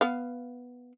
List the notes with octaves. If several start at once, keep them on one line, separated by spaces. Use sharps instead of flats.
B3 F5